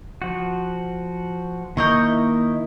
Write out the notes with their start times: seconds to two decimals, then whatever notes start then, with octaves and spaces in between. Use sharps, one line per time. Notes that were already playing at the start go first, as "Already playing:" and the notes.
0.22 F3 F#4
1.77 D#3 A#3 E4 A#4 D#5 C#6 G6